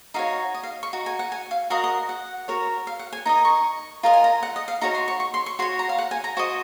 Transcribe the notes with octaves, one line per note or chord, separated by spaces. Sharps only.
D#4 F#4 C#5 F5
D#5
F5
C#6
D#4 F#4
G#5
F#5
G#5
F5
F#4 A#4 D#5 F5
D#5
F#5
F#4 A#4 C#5
F5
F#5
G#5
D#4 A#4 D#5 A#5
C#6
F4 A#4 D#5 A#5
G#5
A#5
F#5
D#5
F5
D#4 F#4 C#5 A#5
C6
C#6
C#6
C6
C#6
F#4 C#5 C6
A#5
F5
F#5
G#5
A#5
F#4 C5 D#5 C#6